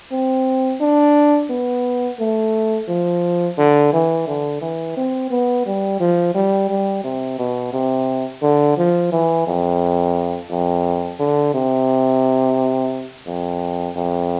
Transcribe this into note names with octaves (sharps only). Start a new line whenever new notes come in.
C4
D4
B3
A3
F3
D3
E3
D3
E3
C4
B3
G3
F3
G3
G3
C3
B2
C3
D3
F3
E3
F2
F2
D3
C3
F2
F2